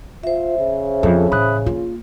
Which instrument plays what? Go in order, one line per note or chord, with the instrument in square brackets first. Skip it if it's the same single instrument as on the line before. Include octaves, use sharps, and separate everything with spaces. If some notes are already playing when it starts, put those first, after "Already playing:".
[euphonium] F4 [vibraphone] C5 E5
[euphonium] C#3
[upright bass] F2 [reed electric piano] A4
[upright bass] A1 [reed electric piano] B5 D#6 F#6
[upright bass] A#3 [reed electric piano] F4